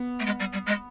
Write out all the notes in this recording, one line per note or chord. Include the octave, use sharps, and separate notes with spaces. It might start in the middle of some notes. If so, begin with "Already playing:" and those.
Already playing: B3
A3
G#3
G3
G3
G#3